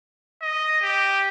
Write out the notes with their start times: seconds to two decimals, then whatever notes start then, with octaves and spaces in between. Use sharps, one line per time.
0.42 D#5
0.82 G4